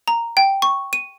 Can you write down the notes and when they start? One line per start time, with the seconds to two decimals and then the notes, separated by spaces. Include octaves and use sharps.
0.08 A#5
0.37 G5
0.62 C#6
0.93 D#7